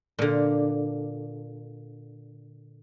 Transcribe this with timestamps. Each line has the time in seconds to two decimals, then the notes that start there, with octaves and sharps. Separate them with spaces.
0.19 A#2 D3